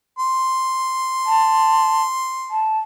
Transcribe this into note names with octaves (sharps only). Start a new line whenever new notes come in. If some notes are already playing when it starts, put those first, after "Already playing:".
C6
A5
A5